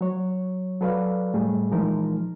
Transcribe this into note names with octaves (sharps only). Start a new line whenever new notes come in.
F#3 C#5
F#3 A4 B4 D5 F5
A2 G3 A3 G#4
A#2 E3 F3 G#3 D#4 A#4